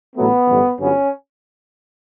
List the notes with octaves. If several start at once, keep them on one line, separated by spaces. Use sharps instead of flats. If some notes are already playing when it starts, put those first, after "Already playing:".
A1 A2 F#3 A3 B3
A1 G2 D3 A3
G1 G2 D3 F#3 B3 C#4